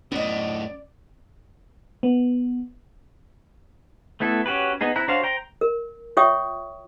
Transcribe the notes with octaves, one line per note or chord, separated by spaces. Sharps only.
F#2 A2 B3 C#4 D5 D#5
B3
A3 B3 E4 A4
C#4 F#4 G4 B4
B3 D#4 G#4
C4 E4 A#5 F#6
D4 F#4 C5 C#5 F5
C5 G5 A#5
A#4
F4 C#5 E5 G5 C#6 D#6